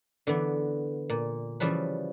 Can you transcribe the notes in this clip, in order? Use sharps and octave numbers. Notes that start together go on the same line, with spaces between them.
D3 E3 B3
A#2
C#3 E3 F3 G3 B4